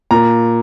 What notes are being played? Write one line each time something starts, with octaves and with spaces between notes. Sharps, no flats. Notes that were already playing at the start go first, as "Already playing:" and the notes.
A#2 A#5